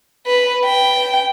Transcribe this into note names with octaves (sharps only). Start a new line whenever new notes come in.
B4
G5